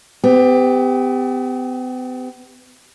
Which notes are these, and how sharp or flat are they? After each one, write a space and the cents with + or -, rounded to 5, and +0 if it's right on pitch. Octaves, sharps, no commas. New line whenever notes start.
B3 +45 G4 +20